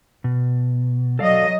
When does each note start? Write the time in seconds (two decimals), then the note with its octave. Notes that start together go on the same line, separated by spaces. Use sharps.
0.24 B2
1.19 F#3 A4 D5 D#5 F5